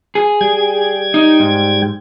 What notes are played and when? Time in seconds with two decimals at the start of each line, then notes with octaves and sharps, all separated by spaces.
0.15 G#4
0.41 G3 G5 G#6
1.14 D#4
1.40 G#2